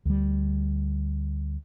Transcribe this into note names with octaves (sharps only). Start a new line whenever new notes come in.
D2 G3